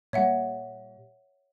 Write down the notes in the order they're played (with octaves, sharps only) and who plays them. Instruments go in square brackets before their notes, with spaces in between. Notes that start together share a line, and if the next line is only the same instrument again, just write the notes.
[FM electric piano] A#2 G3 [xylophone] C#5 E5 F#5